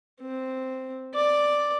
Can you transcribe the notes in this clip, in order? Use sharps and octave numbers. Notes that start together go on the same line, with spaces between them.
C4
D5